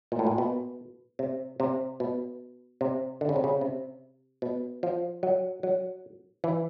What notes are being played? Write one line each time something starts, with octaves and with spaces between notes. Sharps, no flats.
A#2
A2
A#2
B2
C3
C3
B2
C3
D3
C#3
C3
C#3
C3
B2
F3
F#3
F#3
E3